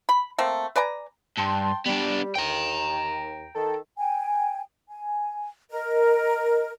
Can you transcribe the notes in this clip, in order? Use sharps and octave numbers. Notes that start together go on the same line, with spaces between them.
B5
A3 A#3 C4
B4 D5 G#5 A#5
G2 G5 A5 C6
G3 B3 D4
D#2 G5 A#5
D#3 A4
G5 G#5
G#5
A#4 D#5